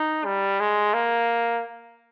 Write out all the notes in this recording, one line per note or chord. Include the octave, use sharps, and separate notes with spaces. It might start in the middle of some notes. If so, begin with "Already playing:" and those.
Already playing: D#4
G3
G#3
A#3